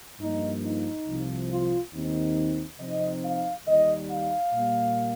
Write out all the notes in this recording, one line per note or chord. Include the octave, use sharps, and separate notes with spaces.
G2 F3 A#3 D#4
D#4
C2 C3 F3
F4
D#2 D#3 C4 D#4
C3 F3 C4 D#4 D#5
F5
D#2 D#3 G3 D#4 D#5
F5
A#2 G3 A#3